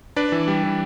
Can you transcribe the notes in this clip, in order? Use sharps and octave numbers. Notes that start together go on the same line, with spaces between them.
D4 B4 D5
E3
G3
E3